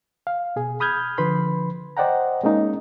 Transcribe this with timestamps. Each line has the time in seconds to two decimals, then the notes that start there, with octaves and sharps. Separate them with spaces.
0.27 F5
0.56 B2 G#4
0.80 B5 D#6 F6 G6 G#6
1.18 D3 F3 B4 B5 C6
1.97 C5 D5 D#5 F#5 G5 A#5
2.44 G#3 A#3 C#4 D#4